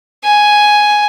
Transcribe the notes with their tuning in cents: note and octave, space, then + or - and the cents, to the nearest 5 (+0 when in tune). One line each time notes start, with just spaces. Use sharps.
G#5 +5